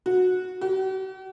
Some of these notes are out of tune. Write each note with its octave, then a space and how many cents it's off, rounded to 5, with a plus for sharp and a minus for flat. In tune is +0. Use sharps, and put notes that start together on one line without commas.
F#4 -15
F#4 +45